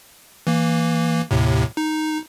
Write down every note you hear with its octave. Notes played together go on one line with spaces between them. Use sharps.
E3 A#3
D#2 A2 C3
D#4